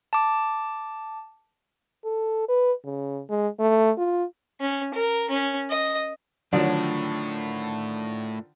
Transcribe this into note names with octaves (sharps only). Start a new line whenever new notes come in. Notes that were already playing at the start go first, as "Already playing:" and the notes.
A5 D6
A4
B4
C#3
G#3
A3
F4
C#4
A#4
C#4
D#5
A2 D3 D#3 F3 F#3 D4